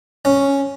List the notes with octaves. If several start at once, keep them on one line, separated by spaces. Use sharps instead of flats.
C#4